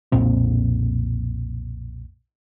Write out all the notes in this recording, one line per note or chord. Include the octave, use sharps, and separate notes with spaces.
B1 F2 A#2 C4